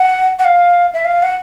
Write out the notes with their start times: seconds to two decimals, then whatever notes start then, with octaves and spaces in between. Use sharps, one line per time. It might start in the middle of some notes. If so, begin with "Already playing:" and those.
Already playing: F#5
0.39 F#5
0.45 F5
0.94 E5
1.05 F5
1.23 F#5